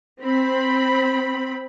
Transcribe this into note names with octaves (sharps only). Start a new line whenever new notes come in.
C4 B5